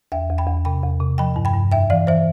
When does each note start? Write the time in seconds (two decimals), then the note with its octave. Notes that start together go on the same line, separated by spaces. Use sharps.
0.12 E2 E5 G5
0.29 E2
0.38 G5 B5
0.47 E2
0.65 C3 G5 B5
0.83 E2
1.00 C3
1.18 F3 G5 B5
1.36 G2
1.45 G5 B5
1.54 G2
1.72 F2 E5 G5
1.90 E3 D5 F5
2.07 E3 C5 E5